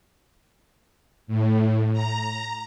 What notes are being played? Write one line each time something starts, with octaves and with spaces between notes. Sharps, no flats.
A2
A#5